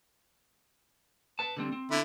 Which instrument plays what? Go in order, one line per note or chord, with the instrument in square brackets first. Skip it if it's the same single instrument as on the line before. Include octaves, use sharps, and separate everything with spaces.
[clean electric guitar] B4 A5
D3 G3 C4
C4
[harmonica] D3 E4